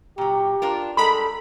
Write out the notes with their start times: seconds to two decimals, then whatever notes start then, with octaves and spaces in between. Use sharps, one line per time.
0.18 A#2 F#3 G4
0.62 D4 F4 A#4
0.97 G3 G#3 A4 A#4 B5